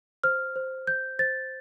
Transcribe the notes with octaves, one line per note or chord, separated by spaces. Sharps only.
C5 F6
C5
C5 G6
C5 A6